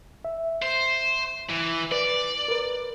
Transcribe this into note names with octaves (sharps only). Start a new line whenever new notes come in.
E5
C5
E3
B4 D5
A#4 B4